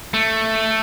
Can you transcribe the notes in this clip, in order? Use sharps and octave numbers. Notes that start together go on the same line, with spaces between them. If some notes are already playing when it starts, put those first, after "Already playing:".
A3